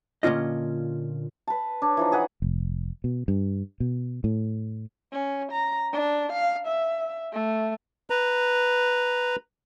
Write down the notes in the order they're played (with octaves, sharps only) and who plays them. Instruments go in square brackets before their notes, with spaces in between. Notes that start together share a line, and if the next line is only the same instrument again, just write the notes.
[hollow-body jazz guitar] A#2 D3 C#4 F4 D#5
[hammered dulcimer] B4 A5
D4 C#5
E3 F3 D#4
G#4 B4 F#5
[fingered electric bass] F1
B2
G2
B2
A2
[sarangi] C#4
A#5
D4
F5
E5
A3
[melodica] B4 A#5